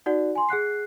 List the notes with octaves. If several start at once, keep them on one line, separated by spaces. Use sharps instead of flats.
D#4 F#4 D5 F#5
G#5 C6
G#4 F#5 F#6 C7